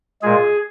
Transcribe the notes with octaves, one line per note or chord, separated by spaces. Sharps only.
A#2 G#3 G#4